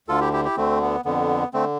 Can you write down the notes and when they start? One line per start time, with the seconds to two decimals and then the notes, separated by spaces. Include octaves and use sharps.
0.08 D2 D3 F4 A4
0.21 E4 G4
0.33 E4 G4
0.45 E4 G4
0.57 D2 D3 A3 C4
0.82 B3
1.05 F2 D3 B3
1.53 D3 A3 C4